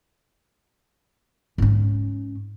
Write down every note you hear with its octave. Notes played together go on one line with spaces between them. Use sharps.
G#2 C#4